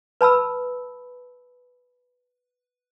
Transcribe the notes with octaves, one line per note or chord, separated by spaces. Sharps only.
B4 A5 B5 E6